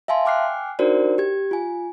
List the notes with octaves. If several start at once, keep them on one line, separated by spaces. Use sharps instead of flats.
E5 F5 G#5 A5 C6
G5 G#5 D6 F6 F#6 C7
D4 D#4 F#4 A#4 C5 D5
G4 G#6
F4 G#5